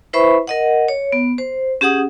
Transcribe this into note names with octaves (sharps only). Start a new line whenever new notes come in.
E4 B4 C5 E5 B5 C#6
A#4 D#5 F#5
C#5
B3
C5
C#4 G4 G#4 F#5 D#6